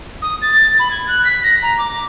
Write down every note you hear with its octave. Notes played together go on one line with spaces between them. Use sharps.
D#6
A6
B5
G#6
F#6
B6
A#6
A#5
D6